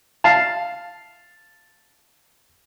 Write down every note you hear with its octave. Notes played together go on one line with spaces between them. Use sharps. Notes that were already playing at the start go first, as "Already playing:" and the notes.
F5 A5